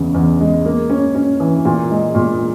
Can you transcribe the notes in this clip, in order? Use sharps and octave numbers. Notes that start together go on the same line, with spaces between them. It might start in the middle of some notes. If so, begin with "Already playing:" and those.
Already playing: E2 C#3
E2
G#3
A#3
C#4
C#4
E3
A#2
G#3
A#2